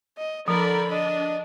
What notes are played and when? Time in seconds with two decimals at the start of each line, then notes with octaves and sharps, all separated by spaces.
0.18 D#5
0.48 D3 F3 A#4 D5 B5
0.91 D4 D#5